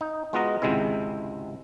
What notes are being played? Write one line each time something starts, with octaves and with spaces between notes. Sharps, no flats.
D#4
G#3 B3 F4 F#4 D#5 A#5
G#1 C#2 C3 G#3 C4 E4